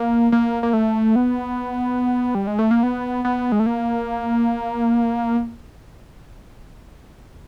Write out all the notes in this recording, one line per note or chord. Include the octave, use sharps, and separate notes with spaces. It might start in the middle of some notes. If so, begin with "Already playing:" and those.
Already playing: A#3
A#3
A#3
A3
B3
G3
G#3
A3
A#3
B3
B3
G#3
A3
A#3